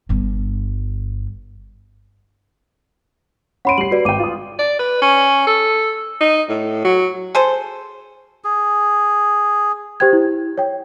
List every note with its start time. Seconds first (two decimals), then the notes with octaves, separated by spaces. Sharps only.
0.09 G1 G2
3.65 C#4 F#5 B5 C6 D7 D#7
3.78 G3 C7 F#7
3.91 F#4 B4 D5
4.05 G#1 G5 D6 D#7
4.19 F4 D#6
4.59 D5
4.79 B4
5.02 C#4
5.47 A4
6.21 D#4
6.49 A2
6.85 F#3
7.35 G#4 A4 C5
8.44 G#4
10.00 G4 C5 G5 G#6
10.13 E4
10.58 C#5 G5